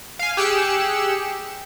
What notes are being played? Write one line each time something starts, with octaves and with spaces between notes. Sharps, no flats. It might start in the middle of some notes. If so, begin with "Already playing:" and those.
F5 G#5
G4 G#4 E6 F#6 C#7 E7